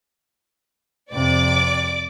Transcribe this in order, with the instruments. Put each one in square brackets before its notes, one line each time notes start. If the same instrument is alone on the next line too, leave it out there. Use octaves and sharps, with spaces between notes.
[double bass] F2 C3 [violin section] D5 D6